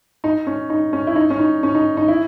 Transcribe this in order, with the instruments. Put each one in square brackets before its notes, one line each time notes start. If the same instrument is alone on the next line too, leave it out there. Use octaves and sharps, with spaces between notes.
[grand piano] D#4
C#4
D#4
C#4
E4
D#4
C#4
D#4
C#4
D#4
D#4
E4